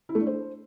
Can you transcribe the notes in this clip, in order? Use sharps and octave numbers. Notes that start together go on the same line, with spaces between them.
E4
A3
D4
C5